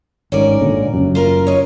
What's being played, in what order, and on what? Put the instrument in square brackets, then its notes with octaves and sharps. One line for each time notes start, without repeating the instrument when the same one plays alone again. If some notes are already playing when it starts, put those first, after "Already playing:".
[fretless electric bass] G#1 G#2 [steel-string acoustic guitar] C#4 A#4 D5
[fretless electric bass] G#1 A#2 D3
F#1 F#2
[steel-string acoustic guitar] F4 A#4
C#5 D#5